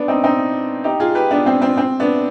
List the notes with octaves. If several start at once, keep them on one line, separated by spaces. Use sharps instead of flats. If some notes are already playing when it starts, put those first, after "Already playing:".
Already playing: B3 D4
C4 D#4
C4 D#4
D#4 G4
F4 G#4
G4 B4
B3 D4
C4
C4
C4
B3 D4